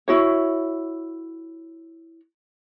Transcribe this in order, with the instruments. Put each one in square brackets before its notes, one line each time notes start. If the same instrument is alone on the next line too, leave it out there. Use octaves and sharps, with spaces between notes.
[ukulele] E4 F#4 C#5